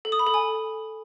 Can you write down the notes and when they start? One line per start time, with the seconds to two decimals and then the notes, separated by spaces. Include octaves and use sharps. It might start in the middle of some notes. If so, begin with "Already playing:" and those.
0.05 A4
0.12 D#6
0.19 B5
0.27 A4
0.34 G#5